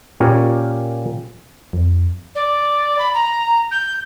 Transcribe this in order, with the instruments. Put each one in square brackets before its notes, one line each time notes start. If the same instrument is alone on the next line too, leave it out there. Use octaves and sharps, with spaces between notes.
[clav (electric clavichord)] A#2 C#4 G4 A#4
[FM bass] F2
[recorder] D5
B5
A#5
G6